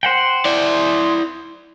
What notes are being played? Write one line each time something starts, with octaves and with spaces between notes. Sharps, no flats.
C5 F#5 G5
E4 D5